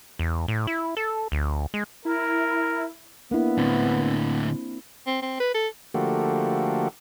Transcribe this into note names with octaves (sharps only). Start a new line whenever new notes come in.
E2
A2
E4
A4
D2
G#3
E4 A#4
A#3 B3 D4 E4
A2 D3 C4
C4
C4
B4
A4
D3 F3 A3 A#3 F#4 G4